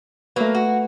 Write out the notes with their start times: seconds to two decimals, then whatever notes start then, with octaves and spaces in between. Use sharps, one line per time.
0.36 F#3 A3 A#3 B4
0.54 F#4